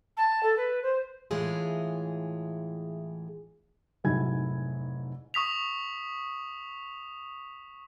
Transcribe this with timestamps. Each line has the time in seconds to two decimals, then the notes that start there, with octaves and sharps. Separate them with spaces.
0.17 A5
0.43 A4
0.57 B4
0.83 C5
1.31 A2 E3 G#3 F4 G#4
4.04 F1 G#2 F#3 E4 G#5 G#6
5.34 C#6 D#6 B6 F7